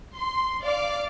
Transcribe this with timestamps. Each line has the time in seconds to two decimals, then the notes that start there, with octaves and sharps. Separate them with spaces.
0.17 C6
0.64 D5 F5 D6